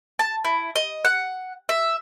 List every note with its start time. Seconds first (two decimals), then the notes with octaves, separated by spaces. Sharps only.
0.19 A5
0.45 E4
0.76 D#5
1.05 F#5
1.69 E5